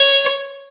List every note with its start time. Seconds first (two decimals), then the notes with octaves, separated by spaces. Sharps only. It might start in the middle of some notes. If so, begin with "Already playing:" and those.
Already playing: C#5